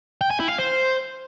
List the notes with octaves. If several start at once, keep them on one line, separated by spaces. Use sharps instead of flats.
G5
G#5
E4
F5
C5